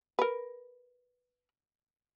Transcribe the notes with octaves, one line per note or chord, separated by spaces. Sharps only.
A#4 B4